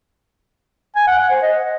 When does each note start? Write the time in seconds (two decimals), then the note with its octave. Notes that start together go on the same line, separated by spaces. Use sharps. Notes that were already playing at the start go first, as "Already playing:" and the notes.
0.96 G#5
1.07 F#5
1.19 F#5
1.31 C5
1.42 D#5